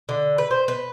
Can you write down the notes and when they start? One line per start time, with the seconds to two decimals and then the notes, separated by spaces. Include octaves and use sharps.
0.09 D3
0.38 B4
0.51 C5
0.68 B4